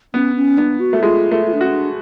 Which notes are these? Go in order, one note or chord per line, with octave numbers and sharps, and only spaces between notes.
B3 C#4
C#4
B3 D4
F#4
A3
G#3 F4
A3
F4
D4
C#4 F#4
D4